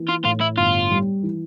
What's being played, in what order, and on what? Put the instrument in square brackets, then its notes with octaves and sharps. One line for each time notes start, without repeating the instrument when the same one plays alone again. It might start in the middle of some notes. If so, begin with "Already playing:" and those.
Already playing: [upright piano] E3 A#3
[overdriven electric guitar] F4
[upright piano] A2 [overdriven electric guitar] F4
[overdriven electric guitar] E4
[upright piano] G1 [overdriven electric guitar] F4
[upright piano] G3
E3